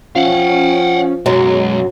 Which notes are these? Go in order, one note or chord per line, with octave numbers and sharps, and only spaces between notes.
F3 C#4 F5 F#5
B1 F#2 F#3 G#3